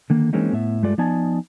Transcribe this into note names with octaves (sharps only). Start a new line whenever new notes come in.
D3 D#3 A#3
E3 G#3 A#3 C4 C#4 D#4
A2 B3 E5
G2 G#3 A3 F4 D5
F3 B3 D#4 D5 G#5 A5